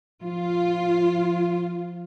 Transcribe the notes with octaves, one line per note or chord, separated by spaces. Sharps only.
F3 F4